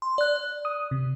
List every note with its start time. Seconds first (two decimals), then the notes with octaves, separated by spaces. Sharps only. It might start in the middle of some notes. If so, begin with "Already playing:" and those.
0.02 C6
0.18 D5 F#6
0.65 D#6
0.91 C3